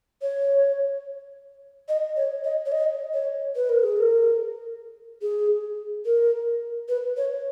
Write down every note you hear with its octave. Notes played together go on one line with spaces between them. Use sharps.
C#5
D#5
C#5
D#5
C#5
D#5
C#5
B4
A#4
G#4
A#4
G#4
A#4
B4
C#5